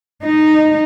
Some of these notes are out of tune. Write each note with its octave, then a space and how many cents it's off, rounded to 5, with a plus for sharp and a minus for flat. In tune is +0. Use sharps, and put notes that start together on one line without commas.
D#4 -10